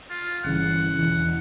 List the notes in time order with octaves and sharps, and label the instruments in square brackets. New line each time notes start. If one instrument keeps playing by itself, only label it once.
[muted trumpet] F4
[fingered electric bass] G1 C#3 E3 [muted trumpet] F#5
[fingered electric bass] E1 E3